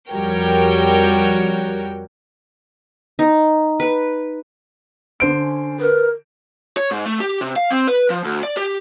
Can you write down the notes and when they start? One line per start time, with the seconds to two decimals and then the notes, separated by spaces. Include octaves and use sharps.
0.10 F2 G3 F#4 A#4 C#5 G5
3.19 D#4
3.80 B4
5.20 D3 B3 C5 D7
5.37 C#4
5.80 A#4 B4
6.77 C#5
6.91 G#2
7.05 A3
7.20 G4
7.41 C3
7.56 F5
7.71 C4
7.88 B4
8.10 F3
8.25 D2
8.43 D5
8.57 G4